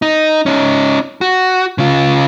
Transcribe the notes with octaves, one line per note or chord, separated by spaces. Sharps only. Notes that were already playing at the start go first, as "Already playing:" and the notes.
D#4
C#4 D#4
F#4
C#3 F4